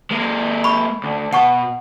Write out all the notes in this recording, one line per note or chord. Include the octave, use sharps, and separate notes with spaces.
G#3 A#3
B5 C#6
D2
B2 F#5 A5 C#6